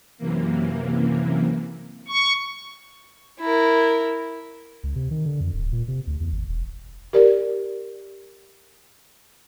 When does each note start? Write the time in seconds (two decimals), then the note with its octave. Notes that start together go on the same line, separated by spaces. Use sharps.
0.18 F#2 C3 E3 A#3
2.08 C#6
3.41 E4 A#4
4.83 C#2
4.95 C3
5.11 D#3
5.25 D3
5.40 F2
5.53 D1
5.72 A#2
5.88 C3
6.07 D2
6.20 E2
6.32 G#1
6.48 E1
7.13 G4 A#4 D5